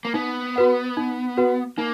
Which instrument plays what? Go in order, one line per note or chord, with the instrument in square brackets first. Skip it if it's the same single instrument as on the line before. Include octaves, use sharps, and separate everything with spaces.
[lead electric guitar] A#3
[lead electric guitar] B3 [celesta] D#4
[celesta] F#4 B4 F#5
D#4
F#4 B4 F#5
[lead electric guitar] A#3 [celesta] D#4